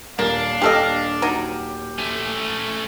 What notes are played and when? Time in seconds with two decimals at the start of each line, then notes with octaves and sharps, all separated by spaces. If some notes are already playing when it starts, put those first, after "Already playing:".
0.19 D#1 A#3 D4 F5
0.62 D#1 G4 A4 D#5 F6
1.22 F#3 D#4 G4
1.98 A3 C#4